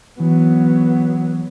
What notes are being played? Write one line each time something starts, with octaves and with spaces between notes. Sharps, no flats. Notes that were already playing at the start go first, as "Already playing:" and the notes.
E3 F#3 B3